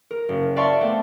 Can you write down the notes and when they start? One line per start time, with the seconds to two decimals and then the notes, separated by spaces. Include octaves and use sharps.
0.11 A#4
0.29 F#1
0.56 D5 E5 F5 A5 C6 C#6
0.81 A3 B3 C4 D5